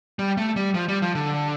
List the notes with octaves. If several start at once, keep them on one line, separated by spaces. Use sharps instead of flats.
G3
A3
G3
F3
G3
F3
D3